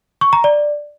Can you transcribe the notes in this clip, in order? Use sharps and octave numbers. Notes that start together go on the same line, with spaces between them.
C#6
A#5
D5